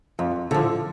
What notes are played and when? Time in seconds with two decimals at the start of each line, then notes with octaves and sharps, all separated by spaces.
0.19 F2
0.51 D3 F3